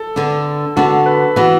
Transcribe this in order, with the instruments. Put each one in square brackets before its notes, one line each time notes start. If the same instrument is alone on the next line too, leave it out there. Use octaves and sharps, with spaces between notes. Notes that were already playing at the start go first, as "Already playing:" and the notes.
Already playing: [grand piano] A4
[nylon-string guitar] D3 B3 D4
[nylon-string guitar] D3 B3 D4 F#4 [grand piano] A4
[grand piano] B4
[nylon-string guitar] E3 B3 [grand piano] F#4